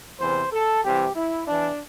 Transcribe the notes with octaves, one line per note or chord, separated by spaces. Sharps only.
E2 C3 E3 C5
A4
C2 C3 E3 G4
E4
E2 E3 D4